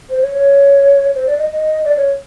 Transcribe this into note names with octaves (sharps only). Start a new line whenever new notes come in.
C5
C#5
C#5
C5
D5
D#5
D#5
D5
C#5